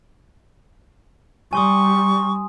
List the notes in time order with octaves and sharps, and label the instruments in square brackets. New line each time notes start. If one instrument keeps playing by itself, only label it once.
[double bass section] G3 [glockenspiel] G#5 C6 D#6 [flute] C#6